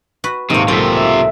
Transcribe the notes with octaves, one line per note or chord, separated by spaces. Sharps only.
F#4 B4
D#1 G#2 C3 A3 A#3
B1 C3 C4 F4 A4 B6
E5